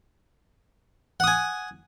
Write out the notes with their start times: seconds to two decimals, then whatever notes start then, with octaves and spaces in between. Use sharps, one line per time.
1.20 F#5
1.24 D#6
1.27 G#5